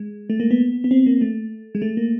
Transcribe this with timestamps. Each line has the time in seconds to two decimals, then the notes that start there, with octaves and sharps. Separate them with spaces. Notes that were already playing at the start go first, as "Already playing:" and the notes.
Already playing: G#3
0.30 A3
0.40 A#3
0.51 B3
0.84 B3
0.91 C4
1.06 A#3
1.21 A3
1.75 G#3
1.82 A3
1.97 A#3